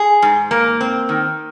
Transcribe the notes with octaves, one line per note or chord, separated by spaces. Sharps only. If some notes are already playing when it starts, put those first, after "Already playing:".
Already playing: G#4
G#2
A#3
C4
D#3